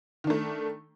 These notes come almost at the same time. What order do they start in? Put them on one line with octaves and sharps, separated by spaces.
D#3 D4 A3